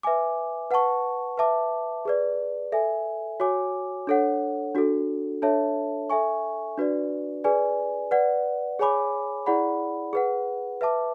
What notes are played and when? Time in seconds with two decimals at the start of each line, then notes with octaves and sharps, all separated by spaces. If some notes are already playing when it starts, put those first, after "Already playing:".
0.03 B4 E5 G#5 D6
0.71 B4 F#5 A5 C#6
1.37 B4 E5 A5 D6
2.05 G#4 B4 D5
2.72 A4 E5 G#5
3.40 F#4 C#5 G#5 D6
4.07 D4 A4 C#5 F#5
4.75 D4 F#4 A4
5.42 D4 A4 C#5 E5 A5
6.10 A4 E5 G#5 C#6
6.77 D4 F#4 B4 D5
7.44 G#4 B4 D5 G#5
8.11 B4 D5 F#5
8.79 G#4 C#5 G#5 B5 D6
9.46 E4 G#4 D5 F#5 B5
10.13 G#4 B4 F#5
10.81 B4 E5 A5 D6